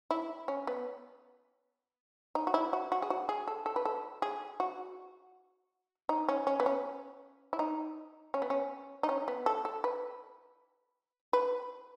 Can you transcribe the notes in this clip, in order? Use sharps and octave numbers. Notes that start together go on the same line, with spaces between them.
E4
C#4
B3
D#4
F#4
E4
F#4
F#4
G#4
F#4
G#4
A4
A4
B4
A4
G#4
F#4
D#4
C#4
C#4
B3
C#4
E4
D#4
C#4
B3
C#4
D#4
C#4
B3
A4
A4
B4
B4